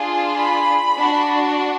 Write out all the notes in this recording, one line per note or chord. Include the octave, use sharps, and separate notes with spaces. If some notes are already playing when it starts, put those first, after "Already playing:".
Already playing: D4 F4 G#4
B5
D4 F#4